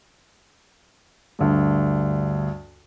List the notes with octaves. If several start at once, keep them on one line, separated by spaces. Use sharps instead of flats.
D2 G2